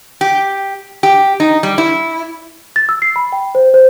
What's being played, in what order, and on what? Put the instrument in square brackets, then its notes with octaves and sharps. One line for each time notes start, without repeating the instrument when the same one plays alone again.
[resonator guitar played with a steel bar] G4
G4
D#4
G3
E4
[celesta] A6
E6
C7
B5
G5
C5
C5